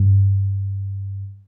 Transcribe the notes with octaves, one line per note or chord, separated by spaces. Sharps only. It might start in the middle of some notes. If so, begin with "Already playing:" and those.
Already playing: G2